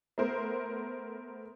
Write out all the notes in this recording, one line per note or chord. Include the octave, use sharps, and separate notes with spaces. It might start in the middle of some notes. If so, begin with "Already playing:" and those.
A3 B3 A#4 C5